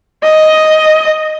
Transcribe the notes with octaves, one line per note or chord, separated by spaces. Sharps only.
D#5